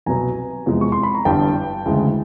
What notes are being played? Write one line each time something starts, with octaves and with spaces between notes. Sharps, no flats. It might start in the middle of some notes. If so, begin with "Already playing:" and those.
C2 B2 F#3 B3 G#5 A#5
E2 C3 F3 G#3
C#6
C6
B5
A#5
G1 G2 E3 G3 G5 A5
D2 C#3 E3 G#3